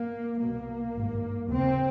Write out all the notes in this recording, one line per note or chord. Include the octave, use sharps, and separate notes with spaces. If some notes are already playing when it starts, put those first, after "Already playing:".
Already playing: A#3
C2 B2 A#3
G#1 G2
F1 D#2 C#3 C4